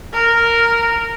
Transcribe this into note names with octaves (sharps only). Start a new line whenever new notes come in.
A#4 F6